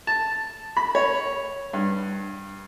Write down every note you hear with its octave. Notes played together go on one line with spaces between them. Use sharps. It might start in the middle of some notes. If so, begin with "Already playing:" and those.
A5
B5
C#5
G2